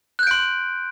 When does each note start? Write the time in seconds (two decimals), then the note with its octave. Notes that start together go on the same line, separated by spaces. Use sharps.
0.19 F#6
0.23 G6
0.27 D7
0.31 C6